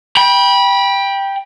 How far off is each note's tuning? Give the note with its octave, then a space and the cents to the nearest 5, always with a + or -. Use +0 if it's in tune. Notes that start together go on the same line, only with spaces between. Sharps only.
G5 +10 B5 -25